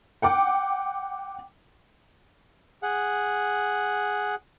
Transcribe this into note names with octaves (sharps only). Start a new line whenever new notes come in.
F#5 G5 D6
G#4 F#5